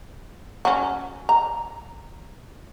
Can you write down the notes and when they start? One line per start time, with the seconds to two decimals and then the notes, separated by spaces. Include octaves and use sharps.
0.65 F#3 C#4
1.29 A#5